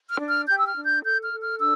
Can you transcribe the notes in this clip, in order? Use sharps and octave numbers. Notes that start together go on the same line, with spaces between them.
F6
D4
F6
G4 G6
E6
F6
D4
G6
A4 G6
F6
A4
F6
D4 E6